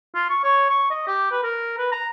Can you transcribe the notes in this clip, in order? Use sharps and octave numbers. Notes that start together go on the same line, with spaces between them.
F4
C#6
C#5
C#6
D#5
G4
B4
A#4
B4
A#5